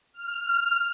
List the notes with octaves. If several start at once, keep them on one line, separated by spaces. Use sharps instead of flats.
F6